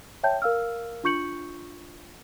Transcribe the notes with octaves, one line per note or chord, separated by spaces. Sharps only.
C#5 E5 G5 A5 G6
A#4 F5 E6 F6
D4 F4 C#6 G6 C#7 F#7